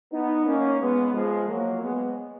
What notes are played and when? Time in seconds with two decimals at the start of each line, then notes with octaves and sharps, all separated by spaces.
0.12 B3 D#4
0.46 A#3 C#4
0.80 G#3 B3
1.13 F3 G#3
1.47 F#3 A#3
1.81 G#3 B3